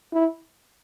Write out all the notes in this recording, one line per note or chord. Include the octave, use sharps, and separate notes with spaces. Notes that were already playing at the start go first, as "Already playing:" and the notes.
E4